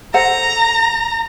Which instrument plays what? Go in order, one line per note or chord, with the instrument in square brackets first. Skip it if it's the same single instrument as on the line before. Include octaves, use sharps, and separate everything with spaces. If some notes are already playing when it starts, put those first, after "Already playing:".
[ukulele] A4 C5 F#5 [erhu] A#5